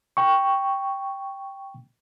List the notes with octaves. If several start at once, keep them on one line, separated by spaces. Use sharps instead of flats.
G5 C#6